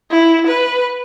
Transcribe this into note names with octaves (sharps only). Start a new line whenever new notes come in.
E4
B4